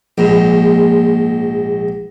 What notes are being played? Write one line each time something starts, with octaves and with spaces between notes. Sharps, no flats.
A#1 G#2